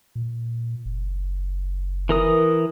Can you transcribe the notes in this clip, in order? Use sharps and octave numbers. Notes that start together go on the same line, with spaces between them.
A#2
F#1
E3 A#4 D#6